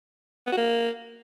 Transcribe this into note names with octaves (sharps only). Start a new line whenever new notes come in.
B3
F#4
A#3